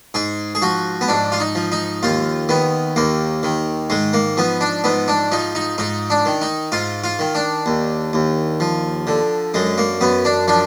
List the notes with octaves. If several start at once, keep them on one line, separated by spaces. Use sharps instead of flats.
G#2 G#4
G#4
F3 F#4
B3
G#2 D4
F4
D#4
F3
D#4
D#2 F4
D#3 B3
D#2 A#3
D#3
G#2 G#3
A#3
F3 B3
D4
G#2 B3
D4
F3 D#4
D#4
G#2 D#4
D4
D#3
D#4
G#2 F4
F4
D#3
D4
D#2
D#2
F3
D3
F#2 G#3
A#3
F#2 B3
D4
F3 D4